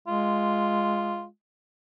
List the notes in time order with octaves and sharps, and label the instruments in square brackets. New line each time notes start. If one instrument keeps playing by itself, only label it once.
[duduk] G#3 [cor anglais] F4